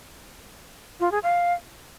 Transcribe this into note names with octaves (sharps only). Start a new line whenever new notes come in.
F4
G#4
F5